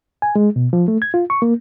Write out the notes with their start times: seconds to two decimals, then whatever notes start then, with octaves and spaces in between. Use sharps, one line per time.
0.22 G#5
0.36 G#3
0.56 B2
0.73 F3
0.88 A3
1.02 G#6
1.14 F4
1.30 C#6
1.42 A#3